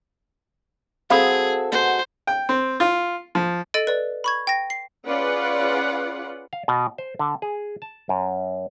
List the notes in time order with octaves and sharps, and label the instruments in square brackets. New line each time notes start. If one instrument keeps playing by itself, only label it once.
[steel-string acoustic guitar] C4 F#4 A4 [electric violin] G#4 [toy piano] F5 B5 D#6
[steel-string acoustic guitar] B2 F#4 G#4 [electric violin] C5
[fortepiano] G5
C4
F4
F3
[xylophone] A4 D#5 A6 D7 D#7
B4 D5
B5 C#6 G#6
G5 A#6
C7
[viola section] C#4 F4 G#4 B4 D5 F#5
[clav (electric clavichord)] F5
B2
C5
D3
G#4
A5
F#2